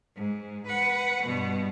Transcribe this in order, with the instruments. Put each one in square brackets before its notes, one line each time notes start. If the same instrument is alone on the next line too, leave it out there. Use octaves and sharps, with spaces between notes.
[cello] G#2
B4 F#5
G2 B2